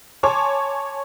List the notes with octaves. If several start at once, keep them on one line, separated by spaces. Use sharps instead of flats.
C#5 G#5 A5 C6 D6